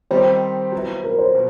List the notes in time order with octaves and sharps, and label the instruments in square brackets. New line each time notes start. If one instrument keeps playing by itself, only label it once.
[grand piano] D#3 G3 C4 D#4 G4 [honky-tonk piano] C5
[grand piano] F#3 B3 E4
[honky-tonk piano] A#4
C5
[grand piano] B2